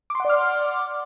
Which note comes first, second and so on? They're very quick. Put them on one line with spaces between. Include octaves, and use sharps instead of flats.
D6 C6 F#5 D5 F6